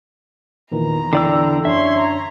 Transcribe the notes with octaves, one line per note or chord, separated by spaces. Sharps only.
E2 A#2 D#3 E3 A#5
D3 E4 D5 G5 D6 E6
F#2 D4 C#5 E5 C6
A#5